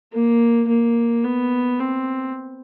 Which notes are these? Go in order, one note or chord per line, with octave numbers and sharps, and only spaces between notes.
A#3
A#3
B3
C4